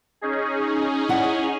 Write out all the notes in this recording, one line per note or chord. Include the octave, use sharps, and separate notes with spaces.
C#4 D#4 G#4
E4 F#5